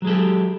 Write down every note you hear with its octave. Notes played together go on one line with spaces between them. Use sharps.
F#3 G#3 G4 A4